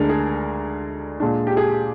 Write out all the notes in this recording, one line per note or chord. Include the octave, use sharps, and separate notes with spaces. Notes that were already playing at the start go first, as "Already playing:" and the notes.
Already playing: D2 D3 G#3 D4 A#4
G#4
A#2 G#3 D4
G4
G#4